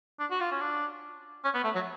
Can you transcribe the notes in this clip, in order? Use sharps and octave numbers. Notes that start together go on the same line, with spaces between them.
D4
F#4
F4
C#4
D4
C#4
B3
A3
F#3